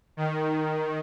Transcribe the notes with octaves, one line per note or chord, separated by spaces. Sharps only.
D#3